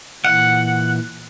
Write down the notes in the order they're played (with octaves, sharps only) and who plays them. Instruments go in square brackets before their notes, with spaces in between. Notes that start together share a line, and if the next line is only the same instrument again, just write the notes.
[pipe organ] A#2 E3 [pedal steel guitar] F#5